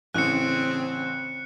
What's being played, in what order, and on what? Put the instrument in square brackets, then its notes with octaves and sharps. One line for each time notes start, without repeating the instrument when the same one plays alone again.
[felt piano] A1 [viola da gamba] C#3 C4 [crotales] F#6 C#7